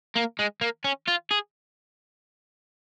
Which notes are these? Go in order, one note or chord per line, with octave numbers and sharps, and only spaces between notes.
A#3
G#3
A#3
C#4
F4
G#4